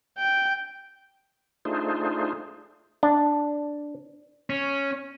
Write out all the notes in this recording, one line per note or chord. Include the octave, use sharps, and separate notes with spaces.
G5
A3 D4 D#4 F4 G#4 C5
D4
C#4